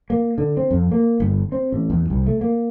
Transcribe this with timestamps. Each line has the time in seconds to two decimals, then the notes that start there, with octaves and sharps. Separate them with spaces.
0.10 A#3
0.38 D3
0.57 C4
0.71 F2
0.91 A#3
1.20 G1
1.52 C4
1.72 A1
1.90 E2
2.10 C2
2.27 A3
2.41 A#3